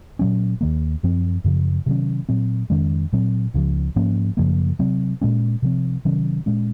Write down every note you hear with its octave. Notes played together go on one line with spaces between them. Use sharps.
A#2 F#3 C#4
D#2 D#3 A#3
F#2 F3 C4
F#2 C#3 F3
C3 D#3 F#3 C#4
A#2 F#3 C4
F2 D#3 G#3 C#4
A#2 F#3 C4
C#2 C#3 F3
G#2 F3 A#3 C#4
F#2 C#3 F3 A#3
C3 F#3 C4
A#2 G#3 C#4
C3 F3 C4
C3 D#3 F#3 C#4
A#2 G#3 C#4